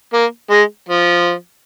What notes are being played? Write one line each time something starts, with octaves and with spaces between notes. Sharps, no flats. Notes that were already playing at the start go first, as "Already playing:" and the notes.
A#3
G#3
F3